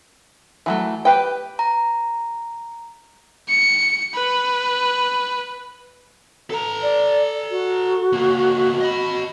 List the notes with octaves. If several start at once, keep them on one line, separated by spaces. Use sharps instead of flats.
E3 F#3 A3
G4 B4 G5
A#5
C#7
B4
A4 A#5
D5
F#4
C#2 A#3
D#5 B5